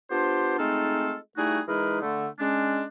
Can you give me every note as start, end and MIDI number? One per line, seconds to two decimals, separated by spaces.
0.10 0.56 59
0.10 0.56 62
0.10 0.56 65
0.10 0.56 67
0.10 0.56 72
0.58 1.15 56
0.58 1.15 57
0.58 1.15 60
0.58 1.15 63
0.58 1.15 65
0.58 1.15 69
1.37 1.59 55
1.37 1.59 57
1.37 1.59 63
1.37 1.59 64
1.37 1.59 66
1.37 1.59 68
1.66 1.97 52
1.66 1.97 56
1.66 1.97 63
1.66 1.97 68
1.66 1.97 70
1.66 1.97 71
2.02 2.27 50
2.02 2.27 57
2.38 2.84 56
2.38 2.84 61
2.38 2.84 62